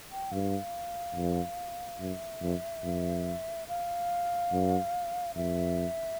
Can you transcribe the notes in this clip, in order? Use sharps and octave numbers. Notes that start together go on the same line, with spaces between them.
G5
G2 F5
F2
F#2 E5
F2
F2
F5
F#2
F2 E5